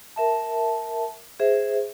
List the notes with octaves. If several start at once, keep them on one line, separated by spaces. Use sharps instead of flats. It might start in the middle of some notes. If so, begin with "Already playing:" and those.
A#4 E5 A5
G#4 C5 E5